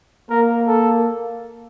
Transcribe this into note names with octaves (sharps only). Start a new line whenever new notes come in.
A#3 A#4
A4